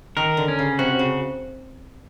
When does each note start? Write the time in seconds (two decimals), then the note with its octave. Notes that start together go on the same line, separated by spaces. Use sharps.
0.17 D#3 A#4
0.37 D3
0.48 C#4
0.59 C#3
0.79 C3 F#4
0.99 C#3